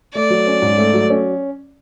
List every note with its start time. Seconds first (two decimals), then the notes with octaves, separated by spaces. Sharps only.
0.15 A3 D5
0.30 F#3
0.47 C#4
0.62 G#2
0.78 A3
0.94 F#3
1.10 C#4